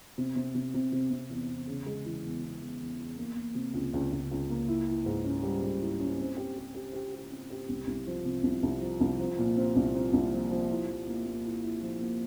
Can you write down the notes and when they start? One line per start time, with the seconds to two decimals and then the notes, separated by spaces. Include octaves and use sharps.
0.18 C3
0.36 C3
0.55 C3
0.74 C3
0.92 C3
1.11 C3
1.30 E2
1.49 E2
1.67 C#3
1.86 G#3
2.05 E3
2.25 E2
2.43 E2
2.61 E2
2.81 E2
2.99 E2
3.17 A#3
3.36 A#3
3.55 C3
3.74 C#2
3.94 C#2
4.12 C#2
4.31 C#2
4.50 A#3
4.68 E4
4.87 E4
5.06 G#2
5.24 C#4
5.43 G3
5.62 G#2
5.81 E4
6.00 C#4
6.18 C4
6.37 G4
6.57 G4
6.75 G4
6.93 G4
7.13 G4
7.32 C4
7.50 G4
7.69 C2
7.87 C2
8.07 F3
8.25 C3
8.43 C2
8.63 C2
8.81 F3
9.01 C2
9.19 F3
9.38 A#2
9.57 C4
9.76 C2
9.94 C4
10.13 C2
10.32 F3
10.51 F3
10.70 E4
10.88 F3
11.07 A#3
11.26 A#3
11.45 E4
11.63 E4
11.82 F3
12.00 A#3